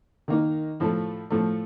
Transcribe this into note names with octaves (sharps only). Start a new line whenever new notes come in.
D#3 A#3 D#4
A2 F3 A3
A2 F3 A3